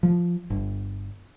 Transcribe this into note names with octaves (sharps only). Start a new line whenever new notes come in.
F3
G1